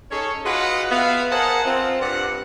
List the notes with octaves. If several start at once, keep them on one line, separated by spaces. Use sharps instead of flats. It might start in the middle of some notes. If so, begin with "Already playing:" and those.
C#4 D#4 G#4 A4 C#5
F4 F#4 G#4 B4 D#5 F#5
B3 E5 F5
G#4 A#4 C5 D#5 F#5 A5
C4 F4
G2 F#5